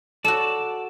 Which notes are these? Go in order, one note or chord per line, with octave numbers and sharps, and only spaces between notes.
F#4 A4 D5 A5